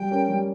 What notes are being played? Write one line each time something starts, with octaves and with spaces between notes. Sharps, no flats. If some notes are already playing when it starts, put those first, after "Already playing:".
Already playing: G3 G5
C#4 G4 A#4
G3